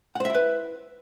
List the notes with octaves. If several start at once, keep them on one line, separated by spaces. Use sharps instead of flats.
E4 B4 C5 E5 F#5